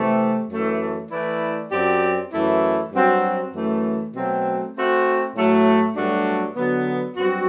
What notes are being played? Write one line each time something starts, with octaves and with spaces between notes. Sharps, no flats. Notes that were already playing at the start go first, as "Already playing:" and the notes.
Already playing: C3 E3 A3 C4
F#2 E3 A3
E3 A3 E4 B4 D5
F#2 F#3 C4 G4 D5
F#2 E3 A3 E4
G2 F#3 C4 F#4
F#2 E3 A3
B2 F#3 A3 C4
A3 C4 F#4
A2 F#3 A3
G2 F#3 A3 D4 F#4
D3 F#3 B3
G2 F#3 C4 F#4